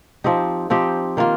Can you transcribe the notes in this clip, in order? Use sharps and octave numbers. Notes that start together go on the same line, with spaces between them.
F3 C4 D#4 G4
F3 C4 D#4 G4
D#3 A#3 F4